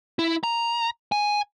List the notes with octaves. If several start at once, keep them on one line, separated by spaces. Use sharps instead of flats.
E4
A#5
G#5